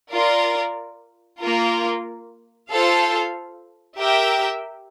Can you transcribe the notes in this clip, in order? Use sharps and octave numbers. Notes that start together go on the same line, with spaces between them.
F4 A#4 D5
A#3 F4 A#4
F4 A4 C5 F5
G4 A#4 E5 G5